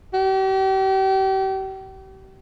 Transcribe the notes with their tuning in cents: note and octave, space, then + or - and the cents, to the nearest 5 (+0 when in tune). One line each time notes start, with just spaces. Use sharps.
G4 -40